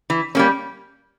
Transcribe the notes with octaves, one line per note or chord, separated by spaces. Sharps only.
E3
G3 A#3 C#4